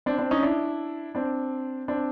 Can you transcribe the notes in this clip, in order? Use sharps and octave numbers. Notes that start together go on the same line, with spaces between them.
C4 D4
C4 D4
C#4 D#4
D4 E4
C4 D4
C4 D4